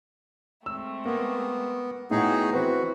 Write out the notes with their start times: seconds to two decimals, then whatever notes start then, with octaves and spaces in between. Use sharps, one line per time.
0.66 G#3 A3 C4 E6
1.05 A#3 B3
2.11 A2 B3 D#4 F#4 G#4 G5
2.53 E3 C4 F#4 B4 C5